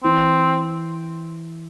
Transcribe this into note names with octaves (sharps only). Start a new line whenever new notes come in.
E3 C4